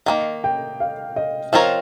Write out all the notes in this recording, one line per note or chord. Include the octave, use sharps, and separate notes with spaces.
D#3 G3 A#3 D#5
G5
F5
D#5
F3 C4 F4 A#4 C#5 D#5